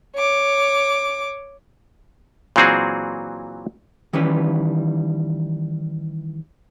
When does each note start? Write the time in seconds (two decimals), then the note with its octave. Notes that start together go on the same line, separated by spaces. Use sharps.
0.15 C#5 D6
2.56 A#2 E3 F#3 C4 F#4 G#4
4.13 D#3 E3 G3 C#4 B4